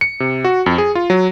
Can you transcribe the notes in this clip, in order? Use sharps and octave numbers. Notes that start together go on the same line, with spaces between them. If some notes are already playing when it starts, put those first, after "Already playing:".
C#7
C3
F#4
F2
G#4
F4
F#3